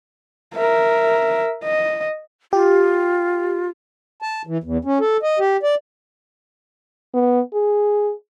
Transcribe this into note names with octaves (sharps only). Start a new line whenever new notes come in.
A#4 E5
D#5
F4 G4
A5
E3
E2
C#4
A4
D#5
G4
D5
B3
G#4